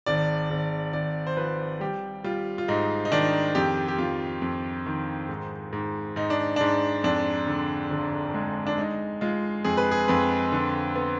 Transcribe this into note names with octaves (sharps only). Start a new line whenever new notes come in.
G#1 D5
G#1
G#1 D5
C5
F3 B4
G3 G4
G3 F4
F4
G#2 D#4
D#4
D#3 D4
F2 G4
G4
F2 F4
F2
D#3
G#2
G#2
G#2 D#4
D4
G#2 D4
F2 D4
D3
G1
G#3
D4
G#3 D#4
G#3 F4
F2 G#4
B4
G#4
F2 B4
D3
B3